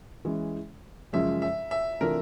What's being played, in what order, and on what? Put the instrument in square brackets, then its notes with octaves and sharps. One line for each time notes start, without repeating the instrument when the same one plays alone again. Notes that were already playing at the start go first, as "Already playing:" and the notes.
[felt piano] E3 G#3 C#4
[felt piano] F#2 C#3 F3 G#3 C#4 [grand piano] E5
[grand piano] E5
E5
[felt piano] C3 E3 A3 D4 F4 [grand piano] A#4